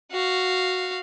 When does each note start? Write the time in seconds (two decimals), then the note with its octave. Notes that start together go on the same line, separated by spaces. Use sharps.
0.12 F#4 F5